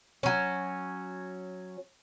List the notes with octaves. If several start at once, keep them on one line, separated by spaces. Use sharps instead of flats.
F#3 C#4